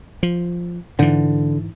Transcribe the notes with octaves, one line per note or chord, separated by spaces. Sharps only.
F3
G#2 D3 E3